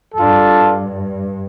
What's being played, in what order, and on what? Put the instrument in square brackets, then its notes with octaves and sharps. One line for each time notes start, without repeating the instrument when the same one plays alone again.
[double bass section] G2 [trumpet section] D4 F4 A4